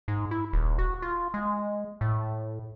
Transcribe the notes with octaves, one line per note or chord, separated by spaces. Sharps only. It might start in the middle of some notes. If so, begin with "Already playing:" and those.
G#2
E4
D#1
F#4
F4
G#3
A2